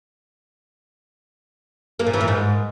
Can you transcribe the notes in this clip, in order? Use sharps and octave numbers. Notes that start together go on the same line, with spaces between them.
A#3
A#2
E3
A#2
G#2